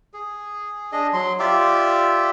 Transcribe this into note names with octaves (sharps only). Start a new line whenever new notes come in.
G#4
D4 G#4 D#5
F#3 C6
F4 G4 D5 E5